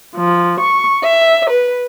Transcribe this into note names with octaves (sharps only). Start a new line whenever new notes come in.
F3
C#6
E5
B4